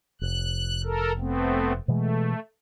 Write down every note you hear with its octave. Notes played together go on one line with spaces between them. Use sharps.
F1 F#6
A4 A#4
A3 B3 C4
B2 E3 G#3 A3